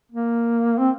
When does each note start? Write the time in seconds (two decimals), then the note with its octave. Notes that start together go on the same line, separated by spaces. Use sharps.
0.12 A#3
0.79 C4